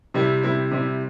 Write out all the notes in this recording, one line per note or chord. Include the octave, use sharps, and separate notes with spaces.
C3 G3 C4 E4
C3 G3 C4 E4
C3 G3 C4 E4